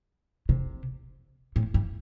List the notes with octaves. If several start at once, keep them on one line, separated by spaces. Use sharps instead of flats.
C3
A2
G2